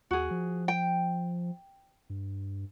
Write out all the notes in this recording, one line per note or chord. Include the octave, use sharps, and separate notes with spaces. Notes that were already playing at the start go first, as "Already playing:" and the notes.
D#2 F#4 G#4
F3
G5
G2